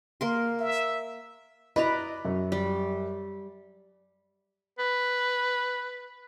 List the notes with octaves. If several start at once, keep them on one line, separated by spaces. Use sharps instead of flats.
A#3 A#4 C6
E5
E4 B4 D5 D#5 A#5 B5
F#2
G3
B4